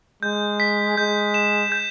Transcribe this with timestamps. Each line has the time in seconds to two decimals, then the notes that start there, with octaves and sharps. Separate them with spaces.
0.23 G#3 G6
0.60 B6
0.97 G#3 G6
1.34 E7
1.72 G6